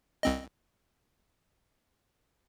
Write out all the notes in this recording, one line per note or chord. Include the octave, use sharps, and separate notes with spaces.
C2 C4 D#5